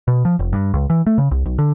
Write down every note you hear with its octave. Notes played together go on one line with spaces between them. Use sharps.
B2
F3
F1
G2
C#2
E3
A3
C#3
C2
B1
D3